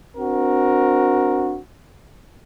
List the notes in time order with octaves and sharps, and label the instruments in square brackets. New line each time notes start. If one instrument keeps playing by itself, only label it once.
[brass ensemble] C4 D4 F#4 A#4